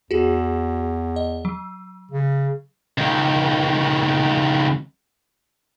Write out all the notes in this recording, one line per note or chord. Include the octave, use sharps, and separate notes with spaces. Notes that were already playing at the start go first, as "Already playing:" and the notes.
E2 F#4 G#4
D#5
F#3
C#3
C#2 D#3